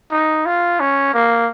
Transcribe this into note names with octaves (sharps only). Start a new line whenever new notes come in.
D#4
F4
C#4
A#3